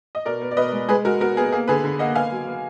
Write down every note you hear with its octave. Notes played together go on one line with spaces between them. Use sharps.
D#5
B2 A#4 D5
B3
D5
B2 B4 D#5
G#3
G#3 G#4 B4
G#3 F#4 A#4
B3 F#4 A#4
B3 G#4
A#3 G#4
D3 G#4 B4
D3
A#3 D#5 F#5
B3 F5 G#5
F#3
B3